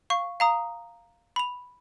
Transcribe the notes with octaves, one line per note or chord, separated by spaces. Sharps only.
F5 C#6
F5 A#5 D#6
B5 F7